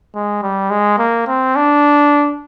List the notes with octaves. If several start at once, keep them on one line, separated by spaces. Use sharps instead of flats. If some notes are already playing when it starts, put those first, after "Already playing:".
G#3
G3
G#3
A#3
C4
D4